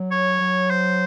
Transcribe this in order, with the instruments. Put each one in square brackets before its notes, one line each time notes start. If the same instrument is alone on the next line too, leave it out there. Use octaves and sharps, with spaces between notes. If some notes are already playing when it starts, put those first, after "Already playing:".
Already playing: [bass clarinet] F#3
[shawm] C#5
[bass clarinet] F#3
[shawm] C5